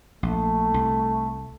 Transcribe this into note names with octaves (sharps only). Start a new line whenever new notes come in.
A#1 A3
C2